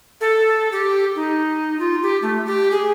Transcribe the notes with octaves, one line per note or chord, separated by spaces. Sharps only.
A4
G4
D#4
F4
G4
A3
G4
G#4